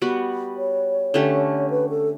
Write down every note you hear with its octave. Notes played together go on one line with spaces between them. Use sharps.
G3 B3 F#4
C#5
D3 A3 C#4 G4
B4
A4